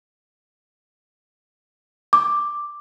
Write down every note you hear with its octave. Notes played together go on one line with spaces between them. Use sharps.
D6